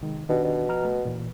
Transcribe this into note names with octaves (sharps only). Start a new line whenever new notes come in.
C3 D#3 G#3
B2 D#3 D4 G4
B2
F3 A#5 F6
A3
A#2 E3